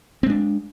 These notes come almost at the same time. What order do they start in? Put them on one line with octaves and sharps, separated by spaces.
C4 G#3 D4